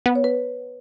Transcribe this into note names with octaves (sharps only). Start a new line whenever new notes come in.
B3
C#5
B4